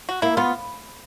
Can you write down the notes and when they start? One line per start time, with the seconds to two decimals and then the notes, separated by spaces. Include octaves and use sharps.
0.09 F#4
0.22 A#3 E4
0.37 B3 F4